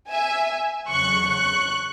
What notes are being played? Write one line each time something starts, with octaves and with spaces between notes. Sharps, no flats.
E5 G#5
E2 C#3 F#3 C#6 F#6
C#6 F#6